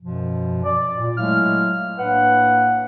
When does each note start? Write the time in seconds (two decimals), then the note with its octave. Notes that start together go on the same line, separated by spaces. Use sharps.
0.01 F#2 B2 F3
0.64 D5
0.97 A#2
1.17 F#3 G#3 A3 E4 F5 F6
1.98 A2 A#3 D4 B4 F#5